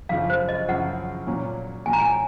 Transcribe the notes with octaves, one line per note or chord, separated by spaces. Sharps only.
F#2 C#3 F3 F5
C5
D#5
F#2 C#3 F3 F#5
A#2 F#3 C#4
A#2 F#3 C#4 G#5
A#5
G#5